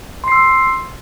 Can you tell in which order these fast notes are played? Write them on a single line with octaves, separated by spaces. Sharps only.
C6 C7 E6